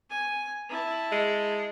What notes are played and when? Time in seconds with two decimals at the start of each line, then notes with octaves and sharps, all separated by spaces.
0.10 G#5
0.69 E4 A5
1.12 G#3